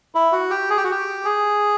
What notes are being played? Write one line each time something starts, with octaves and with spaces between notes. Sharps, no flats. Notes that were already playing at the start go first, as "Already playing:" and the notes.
E4
F#4
G4
G#4
G4
F#4
G4
G#4